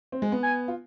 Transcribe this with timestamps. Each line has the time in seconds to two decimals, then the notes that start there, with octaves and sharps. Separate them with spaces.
0.12 C4
0.22 G#3
0.32 B3
0.43 G#5
0.68 F4